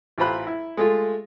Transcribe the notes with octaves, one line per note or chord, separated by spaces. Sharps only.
A1 E3 F4 C5 B5 F#6
E4
G#3 A3 F4